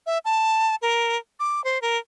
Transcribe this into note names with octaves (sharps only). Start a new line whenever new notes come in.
E5
A5
A#4
D6
C5
A#4